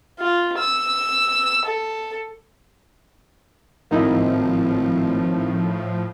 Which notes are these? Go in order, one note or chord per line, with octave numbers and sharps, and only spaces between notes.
F4
E6
A4
G#1 A2 F3 A#3 D#4 E4